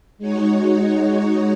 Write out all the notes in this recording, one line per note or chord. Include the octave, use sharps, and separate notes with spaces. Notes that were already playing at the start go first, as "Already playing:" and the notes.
G#3 D#4 F#4 C#5